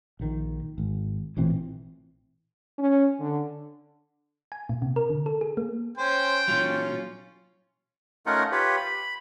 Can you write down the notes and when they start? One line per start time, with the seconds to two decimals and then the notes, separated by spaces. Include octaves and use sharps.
0.20 A#1 D#3
0.78 G#1
1.37 A1 A#2 E3 C4
2.78 C#4
3.20 D3
4.52 G#5
4.69 A#2
4.82 C3
4.96 A#4
5.10 D3
5.26 A4
5.41 G#4
5.57 A#3
5.98 C#4 C5 G5 G#5
6.48 A#2 F#3 C#4 F4
8.26 A3 C#4 D#4 F4 A#4 F#5
8.52 F4 G4 B4 C#5
8.77 B5